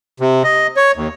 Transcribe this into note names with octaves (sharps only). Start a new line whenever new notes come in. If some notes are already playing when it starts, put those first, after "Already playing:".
C3
D#5
C#5
D#2